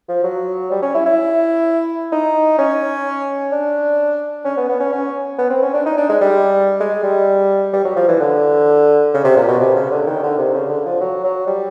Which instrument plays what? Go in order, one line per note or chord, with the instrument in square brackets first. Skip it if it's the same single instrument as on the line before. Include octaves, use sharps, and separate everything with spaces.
[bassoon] F3
F#3
G3
C#4
E4
E4
D#4
C#4
D4
C#4
B3
B3
C#4
C#4
B3
C4
C#4
D4
D#4
D4
G#3
G3
G#3
G3
G3
F#3
F3
E3
D3
C#3
C3
A#2
B2
C3
C#3
D3
D#3
D3
C3
C#3
D3
F3
F#3
F#3
G3